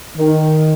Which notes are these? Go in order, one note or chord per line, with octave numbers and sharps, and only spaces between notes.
D#3